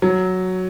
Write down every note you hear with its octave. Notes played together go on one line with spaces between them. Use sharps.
F#3